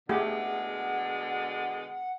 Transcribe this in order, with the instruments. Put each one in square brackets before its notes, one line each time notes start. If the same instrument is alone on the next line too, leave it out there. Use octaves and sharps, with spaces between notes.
[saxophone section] B2 D3 G#3 [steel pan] A3 G4 G#4 [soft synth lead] F#5